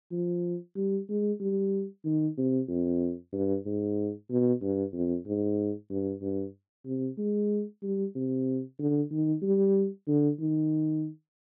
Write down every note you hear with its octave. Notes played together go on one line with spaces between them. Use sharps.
F3
G3
G#3
G3
D#3
C3
F2
G2
G#2
B2
G2
F2
G#2
G2
G2
C3
G#3
G3
C3
D3
D#3
G3
D3
D#3